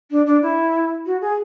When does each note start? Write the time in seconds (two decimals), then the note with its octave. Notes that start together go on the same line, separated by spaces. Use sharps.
0.11 D4
0.27 D4
0.42 E4
1.06 F#4
1.21 G#4